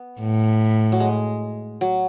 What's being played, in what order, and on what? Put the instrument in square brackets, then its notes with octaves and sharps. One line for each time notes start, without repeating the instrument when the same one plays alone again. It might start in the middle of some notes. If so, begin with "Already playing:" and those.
Already playing: [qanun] B3
[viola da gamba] A2
[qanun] F#3
G#3
F#3